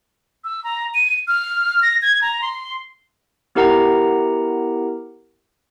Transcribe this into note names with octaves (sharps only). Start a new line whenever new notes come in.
E6
A#5
D#7
F6
A#6
G#6
A#5
C6
B3 E4 G4 A#4 F#5 A#5